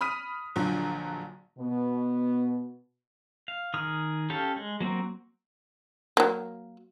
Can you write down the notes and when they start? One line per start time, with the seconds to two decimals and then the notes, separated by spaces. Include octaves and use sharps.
0.01 B5 D#6 F6 B6 D#7
0.56 A#1 D3 F3 F#3
1.59 B2 B3
3.48 F5
3.74 D#3 G#4 D#6 F6
4.30 C#4 G4 A4 F5
4.56 G#3
4.80 F#3 A#3 C4 F#4
6.17 F#3 A#3